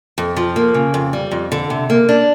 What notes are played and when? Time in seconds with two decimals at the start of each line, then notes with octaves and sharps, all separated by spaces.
0.18 F2
0.37 F3
0.56 A#3
0.74 C#3
0.94 F2
1.13 G3
1.31 F2
1.52 D3
1.70 C3
1.90 A#3
2.09 D4